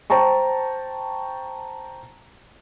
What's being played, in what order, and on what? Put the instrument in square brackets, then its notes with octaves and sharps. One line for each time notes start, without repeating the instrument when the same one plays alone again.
[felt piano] C5 G5 A5 A#5 C#6